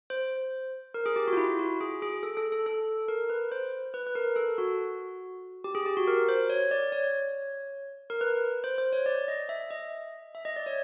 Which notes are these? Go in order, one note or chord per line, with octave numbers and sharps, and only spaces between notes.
C5
A#4
G#4
G4
F#4
F4
E4
F#4
G#4
G#4
A4
A4
A4
A4
A#4
B4
C5
B4
B4
A#4
A4
F#4
G4
G#4
G4
F#4
A#4
C5
C#5
D5
C#5
A#4
B4
C5
C5
C#5
D5
D#5
E5
D#5
E5
D#5
D5
C#5